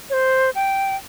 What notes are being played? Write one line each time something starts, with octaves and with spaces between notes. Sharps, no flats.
C#5
C5
G5